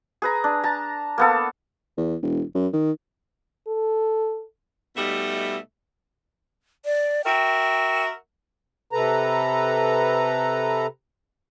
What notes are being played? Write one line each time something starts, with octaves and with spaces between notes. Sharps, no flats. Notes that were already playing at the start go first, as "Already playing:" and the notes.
G#4 B4 A#5
D4
A5 A#5
A#3 B3 A4
E2
E1
F#2
D#3
A4
B2 G3 A3 D#4 E5
D5
F#4 A#4 E5 G5
C3 A4 B4 A#5